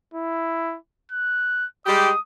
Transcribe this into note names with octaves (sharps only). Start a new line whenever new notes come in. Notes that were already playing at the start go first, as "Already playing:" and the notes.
E4
F#6
G3 G#3 G4 D#6